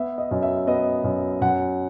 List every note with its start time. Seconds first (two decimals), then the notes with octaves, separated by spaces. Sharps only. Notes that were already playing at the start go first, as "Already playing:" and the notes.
Already playing: B3 E5
0.18 D#5
0.31 F#2
0.43 E5
0.67 B3 D#5
1.04 F#2
1.41 F#2 F#5